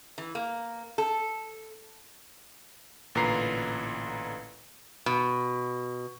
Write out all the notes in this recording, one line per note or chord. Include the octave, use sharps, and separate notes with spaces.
E3
A#3
A4
A1 A#2 D3 B4 A#5 C7
B2